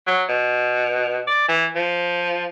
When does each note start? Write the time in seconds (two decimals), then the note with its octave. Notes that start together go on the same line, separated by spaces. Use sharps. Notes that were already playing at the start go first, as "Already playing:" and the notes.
0.07 F#3
0.29 B2
1.27 D5
1.49 E3
1.75 F3